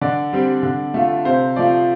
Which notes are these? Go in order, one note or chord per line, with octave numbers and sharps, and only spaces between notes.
D3 D5
G3 C4
D3
A3 F4
C3 C5 F5
F3 A3 F4 D5